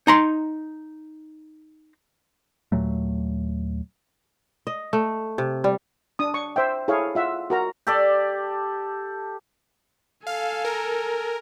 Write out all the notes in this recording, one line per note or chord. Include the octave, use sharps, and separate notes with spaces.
D#4 A#5 C6
D#2 A#2 F#3 A3
D#5
A3
C3
G3
D4 D#6
C#6
C5 E5 G5
E4 G#4 A4 C#5 F5
F4 E5 F#5
F#4 A#4 A#5
G4 A4 D5
A4 F5 G#5
A#4